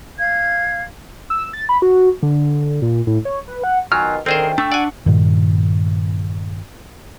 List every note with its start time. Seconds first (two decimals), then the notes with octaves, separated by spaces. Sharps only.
0.19 F5 G#6
1.30 E6
1.53 A6
1.69 B5
1.82 F#4
2.23 D3
2.82 A#2
3.07 A2
3.25 C#5
3.48 B4
3.64 F#5
3.92 B2 D#3 F#3 F4 G#5 F6
4.26 D2 D#3 C4 G#4 A#4 C5 G5
4.58 A3 D4 C#6 E6
4.72 D5 F#5 G#5
5.06 G2 A#2 D#3